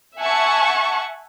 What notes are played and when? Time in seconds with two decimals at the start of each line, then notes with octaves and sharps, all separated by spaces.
0.19 E5 F#5 G#5 A5 C#6